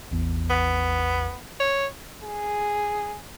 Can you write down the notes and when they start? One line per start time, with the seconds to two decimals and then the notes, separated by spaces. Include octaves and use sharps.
0.11 A1 E2
0.50 B3
1.60 C#5
2.24 G#4